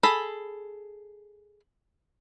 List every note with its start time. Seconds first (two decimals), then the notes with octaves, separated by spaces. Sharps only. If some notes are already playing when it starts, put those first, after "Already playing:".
0.03 G#4 A4 B5